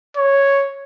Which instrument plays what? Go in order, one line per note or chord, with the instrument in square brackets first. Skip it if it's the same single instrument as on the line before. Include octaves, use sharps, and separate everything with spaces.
[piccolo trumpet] C#5